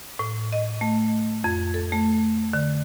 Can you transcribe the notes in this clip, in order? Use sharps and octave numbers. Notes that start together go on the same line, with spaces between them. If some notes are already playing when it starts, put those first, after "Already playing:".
A2
D#5
A3
F2
A4
A3
D3